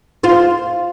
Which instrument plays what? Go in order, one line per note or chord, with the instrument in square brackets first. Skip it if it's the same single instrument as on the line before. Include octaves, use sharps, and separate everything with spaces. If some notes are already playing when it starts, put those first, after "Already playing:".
[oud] F4 C5